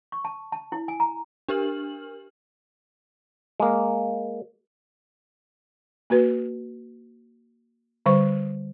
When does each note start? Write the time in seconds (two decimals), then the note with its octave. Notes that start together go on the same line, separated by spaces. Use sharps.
0.12 C#6
0.25 A5
0.52 A5
0.72 E4
0.88 G#5
1.00 A#5
1.49 D4 G4 A#4 F6 F#7
3.60 G#3 A#3
6.10 A#3 F#4 B4
8.06 D3 G3 C5 C#6